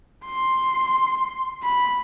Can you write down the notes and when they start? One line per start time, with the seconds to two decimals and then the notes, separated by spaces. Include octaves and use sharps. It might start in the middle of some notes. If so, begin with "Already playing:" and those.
0.26 C6
1.63 B5